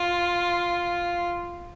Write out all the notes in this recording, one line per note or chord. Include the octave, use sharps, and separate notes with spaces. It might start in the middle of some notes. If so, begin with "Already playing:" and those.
Already playing: F4